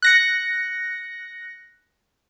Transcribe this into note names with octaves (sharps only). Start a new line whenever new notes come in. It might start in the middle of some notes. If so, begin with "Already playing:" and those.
F#6 A#6 C#7